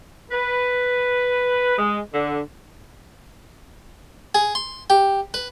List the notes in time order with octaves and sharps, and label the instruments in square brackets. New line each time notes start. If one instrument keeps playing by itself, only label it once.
[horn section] B4
G#3
D3
[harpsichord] G#4
C6
G4
B4